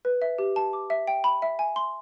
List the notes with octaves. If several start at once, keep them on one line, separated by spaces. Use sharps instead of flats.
B4
E5
G4
A5
D6
E5
G5
B5
E5
G#5
C6